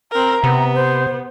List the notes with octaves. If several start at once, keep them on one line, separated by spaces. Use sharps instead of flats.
C4 A#4 A#5
C3 B3
C5